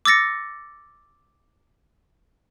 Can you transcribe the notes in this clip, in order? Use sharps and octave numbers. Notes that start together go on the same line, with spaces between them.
D6 E6 A6 A#6 C#7